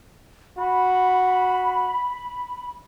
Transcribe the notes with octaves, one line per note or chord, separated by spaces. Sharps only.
F#4 B5